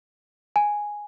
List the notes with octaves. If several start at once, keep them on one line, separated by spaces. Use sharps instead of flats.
G#5